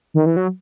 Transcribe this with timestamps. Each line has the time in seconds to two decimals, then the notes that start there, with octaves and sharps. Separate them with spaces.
0.14 D#3
0.26 E3
0.36 F#3